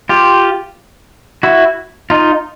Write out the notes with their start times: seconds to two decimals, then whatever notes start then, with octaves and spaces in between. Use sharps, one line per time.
0.09 F4 G4
1.43 E4 F#4
2.10 D#4 F4